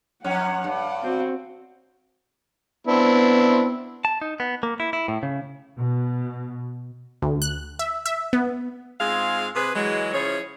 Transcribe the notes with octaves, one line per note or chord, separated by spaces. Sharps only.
F2 C#4 F#5
G2
C4 F#4
B3 C4 D4 E4
A5
D#4
B3
A#3
E4
E4
A2
C#3
B2
D2
F#6
E5
E5
B3
G#2 G#3 C4 F4 G#4 F5
C3 G#4 B4
E3 F#3 G#3
C#3 F3 E4 G#4 C#5